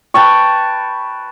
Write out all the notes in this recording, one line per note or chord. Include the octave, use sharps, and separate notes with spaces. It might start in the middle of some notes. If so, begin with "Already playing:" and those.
B4 G5 A5 C#6